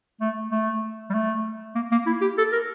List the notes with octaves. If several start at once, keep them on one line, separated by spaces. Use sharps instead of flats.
A3
A3
G3
A3
A#3
A#3
E4
G4
A4
A#4